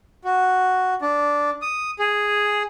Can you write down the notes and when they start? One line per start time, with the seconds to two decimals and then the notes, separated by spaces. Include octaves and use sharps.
0.25 F#4
1.02 D4
1.62 D#6
1.99 G#4